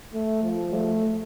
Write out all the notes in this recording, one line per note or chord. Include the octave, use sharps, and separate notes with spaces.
A3
F3
A3